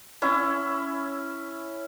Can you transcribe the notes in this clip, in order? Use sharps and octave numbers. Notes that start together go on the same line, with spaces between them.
C#4 E4